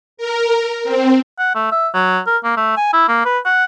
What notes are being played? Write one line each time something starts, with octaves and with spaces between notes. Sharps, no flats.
A#4
C4
F#5
A3
E5
F#3
A#4
A#3
A3
G#5
E4
A#3
B4
F#5